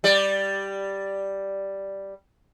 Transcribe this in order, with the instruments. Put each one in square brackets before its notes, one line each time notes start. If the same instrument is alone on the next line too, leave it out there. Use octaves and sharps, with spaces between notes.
[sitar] G3 D5